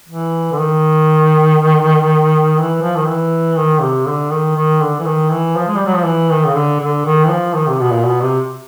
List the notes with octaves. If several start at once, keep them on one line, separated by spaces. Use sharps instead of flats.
E3
D3
D#3
E3
F3
D#3
E3
D#3
C3
D3
D#3
D#3
D3
E3
D#3
E3
F3
G#3
G3
F#3
F3
E3
D#3
C#3
D3
D3
D#3
E3
F3
D#3
C3
B2
A#2
B2
C3